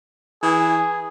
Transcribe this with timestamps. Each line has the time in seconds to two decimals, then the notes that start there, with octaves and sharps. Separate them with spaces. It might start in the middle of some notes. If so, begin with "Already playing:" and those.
0.43 E3 G#4